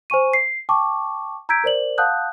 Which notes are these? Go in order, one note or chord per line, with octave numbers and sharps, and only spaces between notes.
C5 G#5 C#6 D#7
C7
G5 A5 C#6 D6
A#5 E6 G6 G#6 B6 D7
A#4 C5 D5 F#7
F5 F#5 A5 D#6 F#6 G6